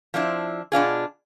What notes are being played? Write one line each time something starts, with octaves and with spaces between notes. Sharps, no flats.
F3 C4 D4 E4
B2 D4 F4 G#4